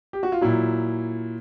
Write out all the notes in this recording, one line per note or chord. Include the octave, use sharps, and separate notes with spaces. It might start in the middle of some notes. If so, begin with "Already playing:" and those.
G4
F#4
F4
A#2 F#3 E4